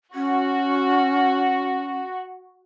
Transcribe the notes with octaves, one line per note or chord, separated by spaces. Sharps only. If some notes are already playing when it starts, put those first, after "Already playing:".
C#4 F#4